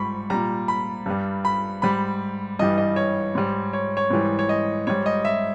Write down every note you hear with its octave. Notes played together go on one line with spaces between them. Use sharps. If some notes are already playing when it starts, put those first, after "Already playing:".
Already playing: G#2 G3 B5 C#6
A#2 G3 A#5
B5
G2 G3
B5
G#2 G3 B5
G2 E3 G3 D#5
D#5
C#5
G#2 G3
C#5
C#5
G#2 E3 G3
C#5
D#5
G#2 G3 C#5
D#5
E5